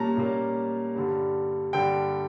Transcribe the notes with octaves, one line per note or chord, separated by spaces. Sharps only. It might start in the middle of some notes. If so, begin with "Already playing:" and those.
Already playing: A#2 G3 A#3 C#4 A5 A#5
A#2 G3 A#3 C#4
G2 D3 G3
G2 D3 G3 G5